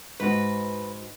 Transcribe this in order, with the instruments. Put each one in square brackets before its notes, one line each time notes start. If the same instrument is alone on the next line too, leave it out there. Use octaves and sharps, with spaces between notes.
[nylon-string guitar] G#2 F#4 [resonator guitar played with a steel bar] B4